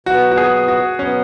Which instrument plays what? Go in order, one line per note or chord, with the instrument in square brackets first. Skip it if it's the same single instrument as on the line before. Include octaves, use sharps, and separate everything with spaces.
[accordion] B2 F#3 B3 [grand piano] F#4
[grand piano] F#4
G#4
F#4
[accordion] B2 F#3 B3 [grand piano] C#4